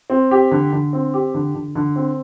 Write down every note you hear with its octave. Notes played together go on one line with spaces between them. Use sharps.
C4
G4
D3
D3
C4
G4
D3
D3
D3
C4